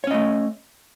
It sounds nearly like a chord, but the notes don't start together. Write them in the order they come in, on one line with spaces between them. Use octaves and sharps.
C#5 C#4 D#5 A3